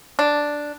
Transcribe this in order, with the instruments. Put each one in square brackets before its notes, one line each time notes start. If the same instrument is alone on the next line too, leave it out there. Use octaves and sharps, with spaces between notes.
[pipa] D4